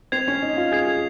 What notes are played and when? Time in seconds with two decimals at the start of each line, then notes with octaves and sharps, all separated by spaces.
0.12 C4 G#6 C7 F7
0.28 C#4
0.42 D#4
0.57 F4
0.72 G#4 G#6 C7 F7
0.87 G#4